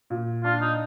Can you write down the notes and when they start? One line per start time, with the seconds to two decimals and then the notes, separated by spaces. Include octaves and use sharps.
0.10 A#2
0.44 D4 F4
0.61 D#4